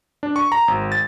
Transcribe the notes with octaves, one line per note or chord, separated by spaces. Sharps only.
D4
C#6
A#5
G#1
A6